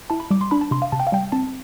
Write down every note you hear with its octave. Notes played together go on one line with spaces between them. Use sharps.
E4 A5
B5
G3 D6
C6
D4 B5
A5
C3 C6
F5
C3 A5
G5
F5
G3 G5
C4 A5